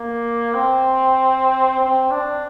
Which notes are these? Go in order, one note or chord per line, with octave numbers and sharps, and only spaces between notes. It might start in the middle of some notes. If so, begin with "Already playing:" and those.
Already playing: A#3
C4
C4
D4